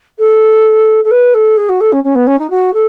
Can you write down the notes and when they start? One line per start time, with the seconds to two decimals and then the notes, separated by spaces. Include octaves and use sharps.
0.18 A4
1.04 A4
1.11 B4
1.34 A4
1.57 G#4
1.69 F#4
1.80 A4
1.92 C#4
2.04 C#4
2.15 B3
2.27 C#4
2.39 D#4
2.50 F#4
2.73 A4